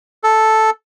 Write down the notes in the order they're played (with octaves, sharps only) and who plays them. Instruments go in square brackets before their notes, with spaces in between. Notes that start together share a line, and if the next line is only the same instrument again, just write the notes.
[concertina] A4